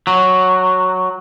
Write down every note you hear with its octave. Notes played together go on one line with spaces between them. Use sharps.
F#3